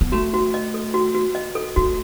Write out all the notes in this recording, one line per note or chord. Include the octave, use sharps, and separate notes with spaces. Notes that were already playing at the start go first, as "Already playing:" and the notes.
B3
A3 F#4
F#4
D#5
A4
F#4
F#4
D#5
A4
A3 F#4